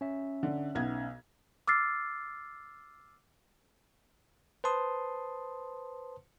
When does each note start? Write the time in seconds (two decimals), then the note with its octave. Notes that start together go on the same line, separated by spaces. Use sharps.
0.01 C#4 E5
0.43 D3
0.75 B1 B3 G#6
1.67 D6 E6 F6 A6 C7
4.64 B4 C5 A5 C6 D#6